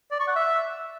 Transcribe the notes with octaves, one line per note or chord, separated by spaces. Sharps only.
D5
C#6
F#5
E5